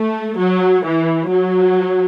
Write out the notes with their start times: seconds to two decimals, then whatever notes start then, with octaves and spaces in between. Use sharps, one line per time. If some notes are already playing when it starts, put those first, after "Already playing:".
Already playing: A3
0.39 F#3
0.84 E3
1.29 F#3